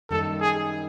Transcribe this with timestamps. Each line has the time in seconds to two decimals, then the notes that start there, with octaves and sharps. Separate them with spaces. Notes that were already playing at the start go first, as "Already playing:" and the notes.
0.11 F#2 D#3 G3 A#3 D#4 A4
0.41 G#4